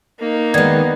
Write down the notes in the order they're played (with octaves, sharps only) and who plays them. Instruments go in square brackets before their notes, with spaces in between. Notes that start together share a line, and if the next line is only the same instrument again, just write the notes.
[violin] A#3 D#4
[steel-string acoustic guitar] D#3 G#3 [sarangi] B3 [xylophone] D5 G#6